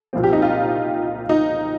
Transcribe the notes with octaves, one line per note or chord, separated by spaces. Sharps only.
C2 A#2 F3 C4
G4
D#4
F4
D#4